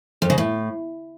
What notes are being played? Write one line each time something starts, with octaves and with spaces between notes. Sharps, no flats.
F2
C#3
A2